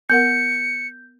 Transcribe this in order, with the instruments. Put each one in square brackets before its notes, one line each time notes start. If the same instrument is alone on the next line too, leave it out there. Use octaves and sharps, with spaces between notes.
[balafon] B3 A#4 F#5 [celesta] G6 [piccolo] C#7